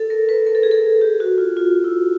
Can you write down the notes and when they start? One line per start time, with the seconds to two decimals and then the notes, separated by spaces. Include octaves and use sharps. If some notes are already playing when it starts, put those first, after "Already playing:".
Already playing: A4
0.10 A#4
0.29 B4
0.46 A#4
0.55 A4
0.63 G#4
0.71 A4
1.02 G4
1.20 F#4
1.38 F4
1.57 F4
1.84 E4